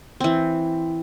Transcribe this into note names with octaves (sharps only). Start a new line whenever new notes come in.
E3 C4